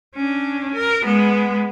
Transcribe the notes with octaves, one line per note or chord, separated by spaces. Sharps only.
C#4 D4
A#4
G#3 B3